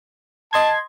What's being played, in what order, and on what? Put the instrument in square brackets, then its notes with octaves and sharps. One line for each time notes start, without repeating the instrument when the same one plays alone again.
[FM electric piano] D#5 C6 G#6 [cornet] A5